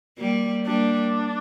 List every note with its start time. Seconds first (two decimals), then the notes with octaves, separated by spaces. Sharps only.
0.18 G3 A#3
0.66 G3 A#3 D4